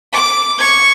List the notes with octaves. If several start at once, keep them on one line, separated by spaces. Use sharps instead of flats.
D6
C#6 G#6